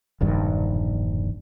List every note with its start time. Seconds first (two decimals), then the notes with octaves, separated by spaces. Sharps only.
0.21 E1 A#1 G2 D#3